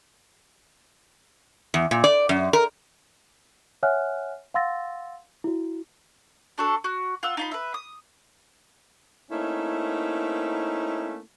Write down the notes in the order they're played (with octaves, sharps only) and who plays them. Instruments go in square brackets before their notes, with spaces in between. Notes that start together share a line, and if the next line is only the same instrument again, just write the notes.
[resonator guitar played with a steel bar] E2
A#2
D5
F#2
A#4
[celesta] C#5 E5 F#5 G#5 F6 F#6
F5 F#5 C6 E6 A6 A#6
E4 F#4
[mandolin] D4 F#4 A4
F#4
F4 F#5 E6
D#4 F4 B5
B4 E5
D#6
[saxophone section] A3 A#3 C4 C#4 D#4 E4